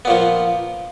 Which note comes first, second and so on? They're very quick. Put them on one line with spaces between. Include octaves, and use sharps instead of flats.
B3 A#2 F3